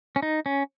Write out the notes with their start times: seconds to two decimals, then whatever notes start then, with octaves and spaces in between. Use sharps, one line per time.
0.16 C#4
0.22 D#4
0.46 C#4